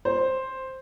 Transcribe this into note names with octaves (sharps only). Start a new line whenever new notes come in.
C5